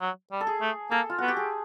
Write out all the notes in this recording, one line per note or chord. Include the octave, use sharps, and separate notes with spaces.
F#3
G3
A4
G#4
A3
A#3 A4
F4
B3 F#4
G4
G#4